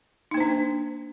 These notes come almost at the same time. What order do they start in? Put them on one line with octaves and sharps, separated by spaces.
D#4 A#3 C5 D4